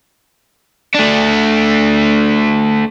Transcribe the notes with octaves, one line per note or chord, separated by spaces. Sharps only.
A3 D4